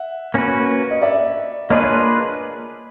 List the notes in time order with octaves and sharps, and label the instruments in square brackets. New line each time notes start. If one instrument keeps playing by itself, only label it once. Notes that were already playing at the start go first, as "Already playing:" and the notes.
Already playing: [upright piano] E5 F#5
[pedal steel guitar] A#3 C#4 F#4 B4
[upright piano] D#5
D5 E5
[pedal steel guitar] A#3 D4 F4 G#4 B4 [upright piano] C#5 D#5